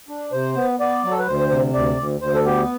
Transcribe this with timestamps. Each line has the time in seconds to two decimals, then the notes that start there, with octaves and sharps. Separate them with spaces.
0.09 D4
0.32 C3 C5
0.56 B3
0.80 B3 D5
1.04 F#3
1.11 A4
1.19 B4
1.27 D2 C5
1.50 C3
1.74 D2 D5
1.97 D2
2.20 D2 C5
2.34 A4
2.45 B3 G4